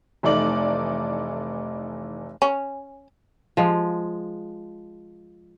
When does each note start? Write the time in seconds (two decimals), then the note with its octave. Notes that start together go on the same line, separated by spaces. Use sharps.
0.23 F1 E3 A3 D#4 D5 F#7
2.42 C#4
3.57 F3 G#3